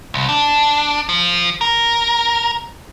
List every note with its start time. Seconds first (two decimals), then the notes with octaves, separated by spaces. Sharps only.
0.14 C2
0.29 D4
1.09 F3
1.61 A#4